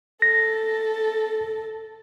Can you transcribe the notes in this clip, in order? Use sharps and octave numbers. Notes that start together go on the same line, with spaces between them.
A4 A#6